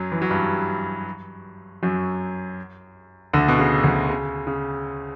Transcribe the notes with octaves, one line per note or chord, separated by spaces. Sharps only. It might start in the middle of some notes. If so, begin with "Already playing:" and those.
Already playing: F#2 F#3
E3
F#3
G2 G3
F#2 F#3
D2 D3
B2
C#3
D2 D3
C#3
C#3